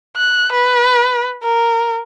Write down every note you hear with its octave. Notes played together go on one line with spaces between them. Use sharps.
F#6
B4
A#4